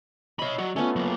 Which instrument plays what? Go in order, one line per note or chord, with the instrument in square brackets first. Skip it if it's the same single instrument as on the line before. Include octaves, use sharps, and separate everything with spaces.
[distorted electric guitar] C#5 B5 [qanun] D#5 E5
[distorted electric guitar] F#3 F#4 [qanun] D5
[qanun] A3 B3 F4 [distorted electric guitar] C#4
[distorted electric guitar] F#3 A#3